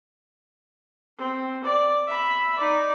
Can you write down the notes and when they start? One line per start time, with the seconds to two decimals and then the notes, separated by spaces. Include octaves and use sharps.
1.18 C4
1.64 D5
2.08 E5 B5
2.58 D#4 D5